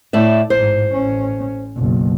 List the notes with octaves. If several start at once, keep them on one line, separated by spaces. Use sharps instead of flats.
A2 D5 E5
A1 G#2 C5
A1 C#4
F#1 B1